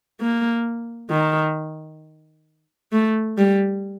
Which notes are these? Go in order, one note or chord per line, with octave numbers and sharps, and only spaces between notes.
A#3
D#3
A3
G3